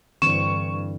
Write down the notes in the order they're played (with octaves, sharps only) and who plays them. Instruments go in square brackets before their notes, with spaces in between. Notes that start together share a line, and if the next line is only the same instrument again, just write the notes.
[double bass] G2 [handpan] D3 E3 C4 [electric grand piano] C#6 [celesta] E7